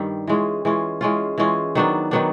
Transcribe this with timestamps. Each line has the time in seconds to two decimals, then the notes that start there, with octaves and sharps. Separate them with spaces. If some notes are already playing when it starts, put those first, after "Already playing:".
Already playing: G2 D#3 G3
0.28 E3 G#3 C#4 F4
0.65 E3 G#3 C#4 F4
1.01 E3 G#3 C#4 F4
1.38 E3 G#3 C#4 F4
1.75 D#3 F#3 B3 D4
2.11 D#3 F#3 B3 D4